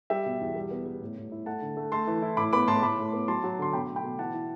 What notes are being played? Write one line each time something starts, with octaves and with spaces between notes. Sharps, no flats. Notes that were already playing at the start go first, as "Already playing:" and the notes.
G3 E5 G5
B2
E2
G3
B3
G3
A2
A2
E4
A3 F#5 A5
D3
A3
A3 A5 C6
E3
E4
A2 B5 D6
B3 B5 D6
A2 A5 C6
A2 B5 D6
A2
B3
F#3 A5 C6
F#3
D3 C6
B2 G5 B5
A3
G5 B5
B2
E3 F#5 A5
E4